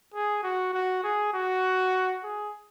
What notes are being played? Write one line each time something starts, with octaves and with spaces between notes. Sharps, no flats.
G#4
F#4
F#4
G#4
F#4
G#4